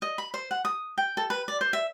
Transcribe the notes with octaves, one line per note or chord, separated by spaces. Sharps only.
D#5
B5
C5
F#5
D#6
G5
A4
B4
D5
C5
E5